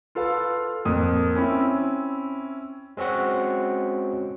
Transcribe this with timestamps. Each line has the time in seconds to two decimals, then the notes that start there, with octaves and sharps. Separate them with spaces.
0.15 F4 A4 B4 F5
0.85 F2 A#3 D#6
1.35 C4 C#4 E4
2.97 G#3 C4 C#4 F#4 F#5